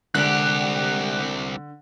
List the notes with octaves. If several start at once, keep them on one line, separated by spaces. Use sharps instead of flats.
C2 D3 G#3 G4 D5 F#5 F#6